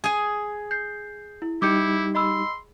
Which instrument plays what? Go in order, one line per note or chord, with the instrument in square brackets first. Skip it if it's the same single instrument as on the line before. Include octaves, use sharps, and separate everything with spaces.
[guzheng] G#4 G#5
[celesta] G6 C7
E4
[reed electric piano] G3 D#4 G4 [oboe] E4 [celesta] D6 G6 C#7
[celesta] D#5 B5 E6 [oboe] C6